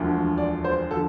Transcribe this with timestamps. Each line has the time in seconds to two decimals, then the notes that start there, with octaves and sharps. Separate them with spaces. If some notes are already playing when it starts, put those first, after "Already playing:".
Already playing: E1 D2 D3 F3
0.38 D5
0.64 C5
0.91 D3 F3 A4